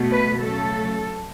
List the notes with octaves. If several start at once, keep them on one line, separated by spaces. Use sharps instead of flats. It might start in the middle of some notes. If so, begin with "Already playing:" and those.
Already playing: B2 A3
B4
C#3 F#3 A3 A4